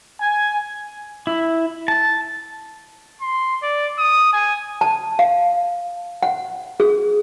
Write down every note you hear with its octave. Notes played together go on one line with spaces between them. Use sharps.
G#5
E4
A5
C6
D5
D#6
G#5
A5
F5
F#5
G#4